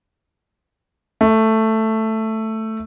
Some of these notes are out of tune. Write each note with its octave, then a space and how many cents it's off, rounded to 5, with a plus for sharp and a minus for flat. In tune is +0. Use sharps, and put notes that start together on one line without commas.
A3 +5